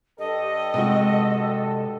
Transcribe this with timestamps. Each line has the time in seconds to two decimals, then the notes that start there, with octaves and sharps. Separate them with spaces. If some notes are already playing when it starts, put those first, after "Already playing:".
0.19 G2 G4 A4 D#5
0.74 C3 G#3 F#4